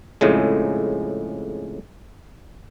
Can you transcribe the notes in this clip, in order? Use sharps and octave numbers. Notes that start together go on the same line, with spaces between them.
F2 A2 C#3 G#3